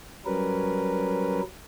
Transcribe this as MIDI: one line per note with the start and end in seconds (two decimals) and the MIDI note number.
0.26 1.41 54
0.26 1.41 55
0.26 1.41 61
0.26 1.41 70
0.26 1.41 71